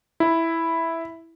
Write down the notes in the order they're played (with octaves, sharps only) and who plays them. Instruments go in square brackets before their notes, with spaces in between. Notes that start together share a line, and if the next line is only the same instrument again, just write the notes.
[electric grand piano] E4